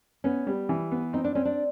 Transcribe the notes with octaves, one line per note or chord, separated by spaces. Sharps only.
B3 C#4
G3
E3
B3
C4 D#4
D4
C4 C#4
D4